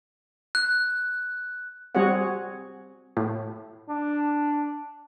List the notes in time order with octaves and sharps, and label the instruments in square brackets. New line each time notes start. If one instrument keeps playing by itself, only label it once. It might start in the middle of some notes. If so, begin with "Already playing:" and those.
[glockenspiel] F#6
[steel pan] G3 C4 F#4 G#4 C#5 F#5
[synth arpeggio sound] A2
[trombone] D4